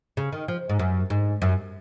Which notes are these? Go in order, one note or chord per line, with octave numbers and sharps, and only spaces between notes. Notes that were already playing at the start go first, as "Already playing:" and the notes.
C#3
D#3
F3
G#2
F#2
G#2
F#2